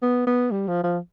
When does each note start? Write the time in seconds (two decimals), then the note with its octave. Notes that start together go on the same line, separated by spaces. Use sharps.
0.02 B3
0.27 B3
0.51 G3
0.68 F3
0.84 F3